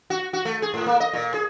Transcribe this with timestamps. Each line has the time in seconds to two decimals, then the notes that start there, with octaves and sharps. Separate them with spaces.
0.10 F#4
0.33 F#4
0.45 A3
0.62 G#4
0.74 A2
0.86 A#3
1.00 D#5
1.13 A#2
1.34 G#4